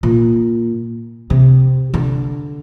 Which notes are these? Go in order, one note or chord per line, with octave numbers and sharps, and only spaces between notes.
A#2
C3
D3